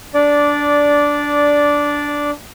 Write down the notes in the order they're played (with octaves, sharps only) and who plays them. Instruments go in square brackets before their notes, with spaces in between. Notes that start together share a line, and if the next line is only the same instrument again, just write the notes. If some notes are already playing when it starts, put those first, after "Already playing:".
[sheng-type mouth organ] D4 D5